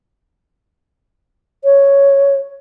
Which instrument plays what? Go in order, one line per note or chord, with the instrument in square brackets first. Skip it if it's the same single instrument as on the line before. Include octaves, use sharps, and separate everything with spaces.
[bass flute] C#5